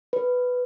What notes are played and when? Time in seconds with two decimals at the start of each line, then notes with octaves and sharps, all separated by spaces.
0.13 B4